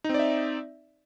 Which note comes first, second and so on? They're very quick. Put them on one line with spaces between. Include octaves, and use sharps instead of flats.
D#4 C4 D5 E5